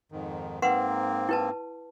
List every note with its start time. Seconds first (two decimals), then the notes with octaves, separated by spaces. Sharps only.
0.12 F2 G#2 D#3
0.62 G#2 A#3 C4 B4 F#5 C6
1.29 E4 B4 A5